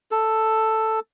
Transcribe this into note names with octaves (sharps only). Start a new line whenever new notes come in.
A4